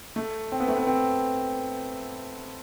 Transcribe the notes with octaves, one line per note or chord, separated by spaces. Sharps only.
A3
C4
B3
A3
B3
C4